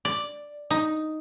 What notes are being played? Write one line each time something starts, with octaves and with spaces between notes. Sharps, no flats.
D5
D#4